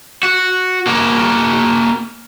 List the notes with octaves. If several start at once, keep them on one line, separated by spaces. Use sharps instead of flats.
F#4
A#3 F#4